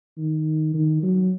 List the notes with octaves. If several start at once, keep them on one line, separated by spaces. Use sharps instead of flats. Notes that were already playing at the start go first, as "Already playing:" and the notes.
D#3
D#3
F#3